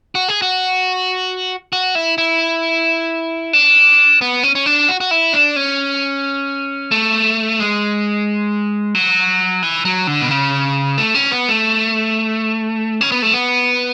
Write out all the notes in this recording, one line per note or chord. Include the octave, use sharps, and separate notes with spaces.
F#4
G#4
F#4
F#4
E4
E4
D4
B3
C#4
C#4
D4
F#4
F#4
E4
D4
C#4
A3
G#3
F#3
E3
F#3
D3
B2
C#3
A3
C#4
B3
A3
C#4
B3
A3
B3